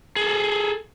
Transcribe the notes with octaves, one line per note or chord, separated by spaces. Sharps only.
G#4 A4